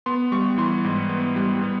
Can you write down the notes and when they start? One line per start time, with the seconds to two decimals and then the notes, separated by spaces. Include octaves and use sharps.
0.06 B3 C6
0.32 G3 C#6
0.57 E3 C6
0.84 G#2
1.09 B3
1.36 G3
1.62 B3